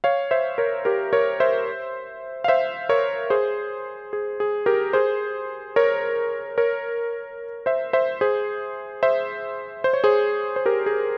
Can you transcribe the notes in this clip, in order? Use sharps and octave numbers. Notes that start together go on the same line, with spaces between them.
C#5 F5
C5 E5
A#4 C#5
G4 A#4
A#4 C#5
C5 E5
F5
C5 E5
A#4 C#5
G#4 C5
G#4
G#4
G4 A#4
G#4 C5
A#4 C#5
A#4 C#5
C5 E5
C5 E5
G#4 C5
C5 E5
C5
C#5
G#4 C5
C5
G4 A#4
G#4